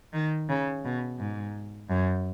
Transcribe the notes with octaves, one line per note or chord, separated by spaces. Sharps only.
D#3
C#3
B2
G#2
F#2